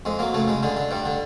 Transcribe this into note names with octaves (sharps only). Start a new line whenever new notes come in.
F2 G#3
F#3 A#3
C#3 A3
C#3 G#3
D3 G#3
D3
G2 G3
D3